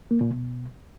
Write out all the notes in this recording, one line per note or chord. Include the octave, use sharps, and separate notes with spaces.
A#3
A#2
B2